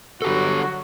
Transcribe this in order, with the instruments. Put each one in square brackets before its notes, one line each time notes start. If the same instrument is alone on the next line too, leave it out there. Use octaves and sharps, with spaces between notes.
[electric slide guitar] D3 G4 A4 [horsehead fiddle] F#3 F#4